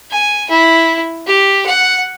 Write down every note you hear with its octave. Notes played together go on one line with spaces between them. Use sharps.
G#5
E4
G4
F#5